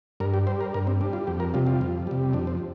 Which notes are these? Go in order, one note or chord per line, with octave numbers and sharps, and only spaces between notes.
G2 A#4
G4
G3 C5
A#4
G2 A#4
C4
G3 D4
F4
F2 G4
A#4
C3 G3 F4
F4
F2
C3 G3
F2 D4
C4